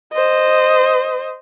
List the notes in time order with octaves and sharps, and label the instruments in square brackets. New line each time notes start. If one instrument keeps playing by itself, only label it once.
[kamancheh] C5 D#5